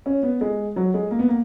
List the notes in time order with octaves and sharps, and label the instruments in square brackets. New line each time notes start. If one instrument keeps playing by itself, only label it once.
[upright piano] C#4
B3
G#3
F#3
G#3
A#3
B3
A#3